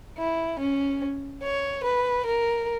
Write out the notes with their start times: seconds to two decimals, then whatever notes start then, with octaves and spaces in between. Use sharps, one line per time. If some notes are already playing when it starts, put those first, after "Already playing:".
0.17 E4
0.59 C#4
1.43 C#5
1.83 B4
2.26 A#4